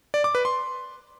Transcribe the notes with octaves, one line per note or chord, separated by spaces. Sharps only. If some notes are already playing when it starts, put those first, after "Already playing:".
D5
D6
B4
C6